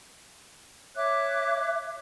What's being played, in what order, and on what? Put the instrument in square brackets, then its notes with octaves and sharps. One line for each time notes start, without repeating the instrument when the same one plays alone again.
[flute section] C#5 E5 D6 F#6